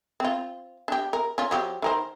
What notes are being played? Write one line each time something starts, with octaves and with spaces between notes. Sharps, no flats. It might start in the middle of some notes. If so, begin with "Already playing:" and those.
C4 F4
D4 G4
A#4
C#4 F4
F3 F#3 G4
D#3 A#4 C5